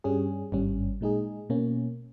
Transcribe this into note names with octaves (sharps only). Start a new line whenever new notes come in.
G2 G3 C#4 G#4
G#1 G2 G3 C#4
A#2 G#3 D#4 G#4
B2 A#3 C#4